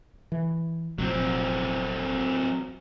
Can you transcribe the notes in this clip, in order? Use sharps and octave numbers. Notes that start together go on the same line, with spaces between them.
E3
F1 A#1 F#3 C4